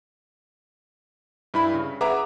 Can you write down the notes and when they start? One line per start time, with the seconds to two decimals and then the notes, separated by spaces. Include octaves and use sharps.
1.54 G2 E4 B5
1.74 C#3
2.01 G#4 B4 E5 F#5 A#5 D6